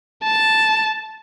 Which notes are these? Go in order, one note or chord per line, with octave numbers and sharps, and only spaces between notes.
A5